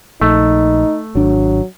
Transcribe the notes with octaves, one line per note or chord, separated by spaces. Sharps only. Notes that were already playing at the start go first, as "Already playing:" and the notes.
A#1 A3 D#4
G#1 F#3 D4